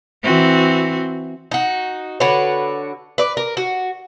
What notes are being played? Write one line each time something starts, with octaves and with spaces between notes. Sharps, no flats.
E3 C4 F#4
D#4 F#4
D3 F#4 B4 C#5
B4 D5
A#4
F#4